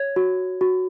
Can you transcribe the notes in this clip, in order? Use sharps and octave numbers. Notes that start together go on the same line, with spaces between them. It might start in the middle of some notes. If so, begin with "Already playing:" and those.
Already playing: C#5 G#6
F#4
F#4